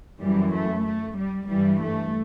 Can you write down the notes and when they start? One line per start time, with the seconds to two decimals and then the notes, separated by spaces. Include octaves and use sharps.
0.20 F#2 E3 G3
0.52 A3
0.85 A3
1.17 G3
1.49 G2 E3 G3
1.82 A3